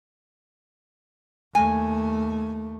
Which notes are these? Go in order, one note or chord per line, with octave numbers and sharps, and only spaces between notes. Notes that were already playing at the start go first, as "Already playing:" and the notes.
D#2 A3 G#5